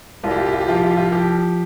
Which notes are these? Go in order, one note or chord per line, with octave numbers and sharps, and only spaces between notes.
C2 F4
G4
F4
G4
F4
G4
F3 F4
G4
F4
G4
F4
F3 G4